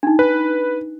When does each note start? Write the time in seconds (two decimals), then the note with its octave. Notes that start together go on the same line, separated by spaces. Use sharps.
0.03 D4 D#4
0.19 B4